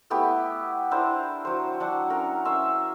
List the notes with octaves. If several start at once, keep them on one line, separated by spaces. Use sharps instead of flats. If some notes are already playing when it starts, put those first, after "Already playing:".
A3 B3 E4 G4
D4 E4 A#4 C5
F#3 C5
F#3 D4 F#5
C#4 A#4
C#4 E5 C6